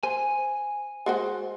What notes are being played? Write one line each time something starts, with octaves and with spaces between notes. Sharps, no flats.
C5 G#5
G#3 F#4 C5